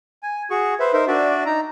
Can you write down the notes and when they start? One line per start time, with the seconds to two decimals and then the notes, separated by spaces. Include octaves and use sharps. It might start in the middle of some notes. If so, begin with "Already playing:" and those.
0.23 G#5
0.50 F#4 G#4 C#6
0.80 B4 C5 E5
0.93 D#4 A#4 C5 E5
1.07 D4 F#4 D5 E5
1.46 D#4 A#5